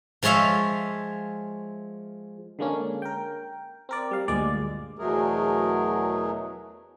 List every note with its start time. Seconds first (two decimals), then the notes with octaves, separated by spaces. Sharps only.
0.23 F3 G#3 C#5 E5 F5
2.59 D3 G#3 A#3 C#4 D4
3.02 A#4 G5
3.89 C4 A#4 D5
4.11 G3 F5
4.28 D2 G2 A#2 G#3 D5 D6
4.99 E2 B2 F#3 A3 G#4 A#4